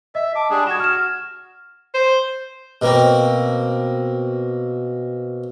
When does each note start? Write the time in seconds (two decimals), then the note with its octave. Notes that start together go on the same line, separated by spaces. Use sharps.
0.15 D#5 E5
0.35 A5 D6
0.50 G3 D4 G#4
0.67 F#4 G#6 E7
0.80 F6 E7
1.94 C5
2.82 B2 A#3 C4